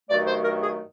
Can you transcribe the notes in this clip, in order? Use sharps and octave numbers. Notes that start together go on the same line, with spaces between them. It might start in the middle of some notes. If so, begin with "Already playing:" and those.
G2 D#3 F#3 A3 D5
C5
A#4
G#4